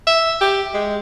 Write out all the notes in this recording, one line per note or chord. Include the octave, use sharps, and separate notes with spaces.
E5
G4
G#3